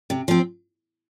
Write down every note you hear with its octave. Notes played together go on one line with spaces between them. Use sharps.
C3
F3 C4